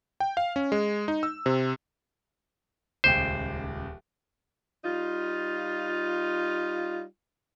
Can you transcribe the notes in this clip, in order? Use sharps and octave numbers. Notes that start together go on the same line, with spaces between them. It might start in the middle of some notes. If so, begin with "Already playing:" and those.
G5
F5
C#4
G#3
D#4
E6
C3
D#1 C#2 C5 G5
G3 D#4 F4